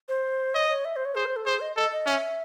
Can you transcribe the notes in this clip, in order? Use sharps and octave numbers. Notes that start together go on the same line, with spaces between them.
C5
C#5 D#5
C#5
E5
C5
C#5
G#4 C5
C5
A4
G#4 C5
D#5
A4 D#5
D#5
C#4 E5